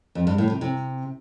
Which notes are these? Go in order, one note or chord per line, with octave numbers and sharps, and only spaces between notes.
F2
G2
A2
C3
C3